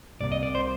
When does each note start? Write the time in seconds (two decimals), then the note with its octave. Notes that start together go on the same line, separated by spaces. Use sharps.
0.20 C2 C3 F3 A#3 D5
0.32 D#5
0.43 D5
0.55 C5